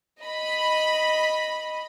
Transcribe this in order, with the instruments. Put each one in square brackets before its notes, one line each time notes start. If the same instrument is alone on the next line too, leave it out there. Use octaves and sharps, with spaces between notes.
[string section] D#5 B5